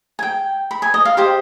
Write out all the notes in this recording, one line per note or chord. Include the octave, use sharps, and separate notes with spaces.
G#5
G5
B5
G#5
D#5
F5
G4 C5 D#5